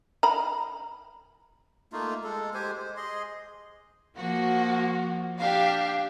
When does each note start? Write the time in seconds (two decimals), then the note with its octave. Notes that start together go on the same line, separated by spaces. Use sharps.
0.23 A#5 B5
1.92 A3 A#3 D#4 F4
2.24 G#3 A4
2.54 G#3 G4 C5 G#5
2.79 C5
2.97 G#4 D#5 C6
4.17 F3 A#3 F#4
5.38 D4 G4 F5